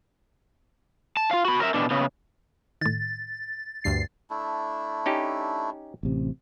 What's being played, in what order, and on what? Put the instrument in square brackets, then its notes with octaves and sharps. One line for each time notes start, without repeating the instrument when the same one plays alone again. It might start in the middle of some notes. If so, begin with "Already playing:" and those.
[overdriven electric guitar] A5
F4 F5
F#4 B5
A#4 E5
B2 D4
C#3 B3
[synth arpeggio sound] A2 D#3 [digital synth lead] A6
[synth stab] D2 G2 C7
[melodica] A3 D4 E4
[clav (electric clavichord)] C#4 D#4 G4
[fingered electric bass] A1 C3